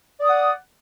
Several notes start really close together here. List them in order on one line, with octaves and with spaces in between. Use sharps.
D5 D#6 F#5